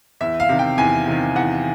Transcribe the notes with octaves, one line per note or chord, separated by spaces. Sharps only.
E2 E5
F5
C3 D#3
G5
E2 G#5
C3 D#3
E2 F#5